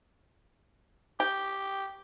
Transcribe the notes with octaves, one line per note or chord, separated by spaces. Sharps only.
G4 G5